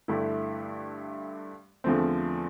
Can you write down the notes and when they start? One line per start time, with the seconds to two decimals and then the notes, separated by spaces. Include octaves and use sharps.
0.08 G2 D3 A3 E4 G4
1.84 E2 D3 F3 A3 C4